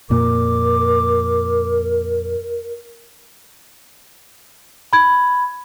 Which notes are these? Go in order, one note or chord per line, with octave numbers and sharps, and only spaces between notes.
F2 A#2 A#3 A#4 D6
B5 G#6